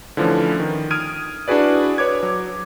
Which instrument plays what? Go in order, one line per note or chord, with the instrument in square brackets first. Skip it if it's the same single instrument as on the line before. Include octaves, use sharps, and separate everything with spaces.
[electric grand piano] D3 E3 F3 A3 C#4
D#3
D#6 F6 G#6 D7 D#7
D4 E4 F#4 G#4 B4 D5
B4 C#5 D6 G#6
F#3